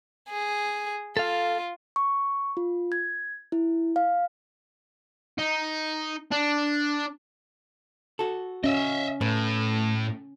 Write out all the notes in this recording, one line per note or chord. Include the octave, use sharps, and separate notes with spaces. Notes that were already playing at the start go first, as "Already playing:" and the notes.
G#4
F4 A4 F5
C#6
F4
G#6
E4
F5
D#4
D4
F#4 A4
C#4 D#5 E5
A2 A3 B4